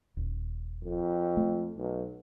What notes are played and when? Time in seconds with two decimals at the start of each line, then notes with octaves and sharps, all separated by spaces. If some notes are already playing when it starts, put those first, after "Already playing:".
0.17 D#1
0.84 F2
1.37 A3
1.76 B1